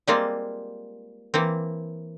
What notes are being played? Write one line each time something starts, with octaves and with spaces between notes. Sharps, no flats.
G3 G#3 A#3 C4 F4
E3 A#3 C4